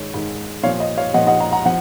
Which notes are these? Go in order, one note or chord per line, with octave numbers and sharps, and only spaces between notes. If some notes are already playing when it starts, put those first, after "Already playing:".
Already playing: G#2 D#3 C#5
G#2 D#3
A#2 F3 C#5 F5
D#5
C#5 F5
A#2 F3 D#5 F#5
D#5 F#5
F#5 A#5
F#5 A#5
F3 F#5